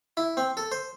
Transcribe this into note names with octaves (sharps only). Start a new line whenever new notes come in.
E4
C4
A4
C5